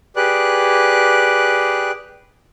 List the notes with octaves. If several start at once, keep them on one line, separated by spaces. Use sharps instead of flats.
G4 G#4 B4 D5 F#6